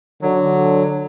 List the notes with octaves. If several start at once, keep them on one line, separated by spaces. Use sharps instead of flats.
D3 F#3